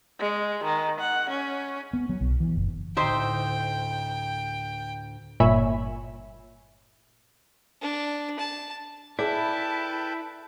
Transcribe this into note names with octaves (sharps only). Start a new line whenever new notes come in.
G#3
D#3
F#5
C#4
B3
F#3
B1
E3
F#1
D2 A2 D#4 C5 E5 G5
G1 A#2 C#5 E5 G#5 B5
D4
A5
E4 G#4 A4 B4 D5 G5 A5